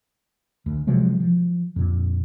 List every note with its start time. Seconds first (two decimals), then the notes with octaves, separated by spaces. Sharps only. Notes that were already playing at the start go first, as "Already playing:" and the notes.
0.66 D2
0.87 C3 F3 F#3 G#3
1.20 F3
1.76 F2 A#2